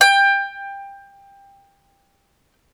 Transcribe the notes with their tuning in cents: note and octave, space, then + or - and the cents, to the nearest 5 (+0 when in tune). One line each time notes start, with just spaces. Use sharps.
G5 +20